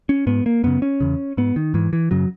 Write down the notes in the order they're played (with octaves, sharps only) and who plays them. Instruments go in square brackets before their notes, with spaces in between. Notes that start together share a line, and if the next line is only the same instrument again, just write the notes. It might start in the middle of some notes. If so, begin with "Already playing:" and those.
[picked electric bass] C#4
G#2 B3
A#3
F#2 C#3 B3
C#4
E2 C#3
G#2 B3
D#3
G#2 E3
E3
F#2 C#3 F#3